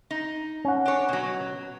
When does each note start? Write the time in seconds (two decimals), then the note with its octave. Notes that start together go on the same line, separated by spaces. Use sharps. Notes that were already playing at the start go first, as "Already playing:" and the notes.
0.11 D#4
0.65 C#4 F#5
0.86 D4 C#5
1.09 B2 F#3